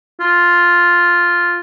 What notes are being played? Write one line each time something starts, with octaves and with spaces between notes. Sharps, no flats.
F4